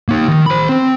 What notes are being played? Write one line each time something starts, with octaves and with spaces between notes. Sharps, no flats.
A#3 D#4
D#3
C5 B5
C4